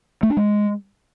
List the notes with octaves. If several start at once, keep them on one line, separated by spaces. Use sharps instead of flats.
A3
D4
G#3